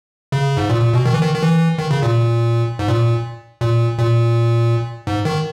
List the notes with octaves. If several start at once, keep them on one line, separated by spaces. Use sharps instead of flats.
C#3
G#2
A#2
A#2
B2
D#3
E3
D#3
D#3
E3
D#3
C#3
A#2
G#2
A#2
A#2
A#2
G#2
D#3